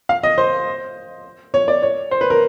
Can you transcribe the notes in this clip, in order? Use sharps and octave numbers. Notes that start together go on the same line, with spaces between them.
F5
D#5
C5
C#5
D5
C#5
C5
B4
A#4